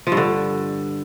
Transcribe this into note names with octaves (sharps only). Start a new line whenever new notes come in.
F3
G2
D3